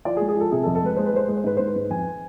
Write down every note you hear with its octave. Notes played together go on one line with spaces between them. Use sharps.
F3 D5
G#4
G#3
G#4
F3 A4
C3 G#4
A4
F2
A4
G#3 B4
G#3 C5
B4
G#3 C5
G#3 B4
C5
G#2 B4
G#2 C5
B4
G#2
F2 G#5